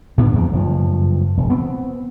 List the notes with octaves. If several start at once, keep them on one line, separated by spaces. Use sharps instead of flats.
A2 D3 B3 D4
E2 F3 G#3 C4
F#1 G2 F3
E1
B3 C4